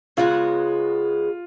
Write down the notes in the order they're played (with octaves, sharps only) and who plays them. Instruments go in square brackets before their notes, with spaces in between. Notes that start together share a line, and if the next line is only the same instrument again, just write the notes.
[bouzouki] C#3 G#3 B3 F#4 [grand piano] F4